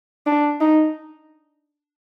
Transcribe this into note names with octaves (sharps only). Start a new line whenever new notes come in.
D4
D#4